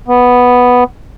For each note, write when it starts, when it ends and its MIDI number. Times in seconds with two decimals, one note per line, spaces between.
0.08 0.84 59